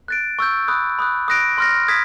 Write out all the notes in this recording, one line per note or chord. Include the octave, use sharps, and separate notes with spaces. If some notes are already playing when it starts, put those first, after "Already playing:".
F#6 A6 D7
C#6 E6 G6
B5 D#6 F#6
B5 D#6 F#6
D#6 F#6 A#6 D7
C6 F6 A#6
D#6 G#6 B6